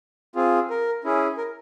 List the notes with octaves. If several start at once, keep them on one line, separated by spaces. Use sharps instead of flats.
C4 F4 G#4
A#4
C#4 E4 G#4
A#4